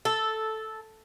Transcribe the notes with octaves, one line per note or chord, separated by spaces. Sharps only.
A4